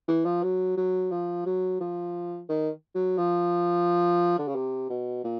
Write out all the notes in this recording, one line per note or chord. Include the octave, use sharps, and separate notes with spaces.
E3
F3
F#3
F#3
F3
F#3
F3
D#3
F#3
F3
D3
C#3
C3
B2
A#2